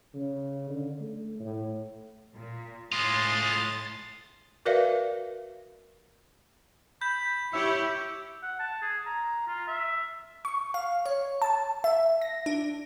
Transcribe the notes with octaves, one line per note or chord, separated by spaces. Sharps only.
C#3
D3
A3
A2
A#2
A2 G#3 F4 C6 D#6 A6
F#4 A#4 B4 D5 E5 F5
B5 G6
E4 G4 C#5 E5
F#5
A5
G#4
A#5
F4
E5
C#6
F5
C#5
A5
E5
A#6
D4